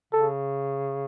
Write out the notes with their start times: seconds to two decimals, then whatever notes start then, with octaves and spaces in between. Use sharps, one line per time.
0.13 C#3 A4